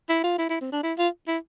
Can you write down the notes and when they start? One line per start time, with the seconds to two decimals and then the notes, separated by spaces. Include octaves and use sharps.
0.09 E4
0.24 F4
0.38 E4
0.50 E4
0.61 C4
0.72 D4
0.83 E4
0.98 F4
1.28 E4